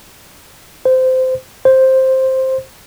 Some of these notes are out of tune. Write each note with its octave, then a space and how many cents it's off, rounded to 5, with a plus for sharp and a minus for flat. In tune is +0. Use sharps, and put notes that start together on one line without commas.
C5 -20
C5 +5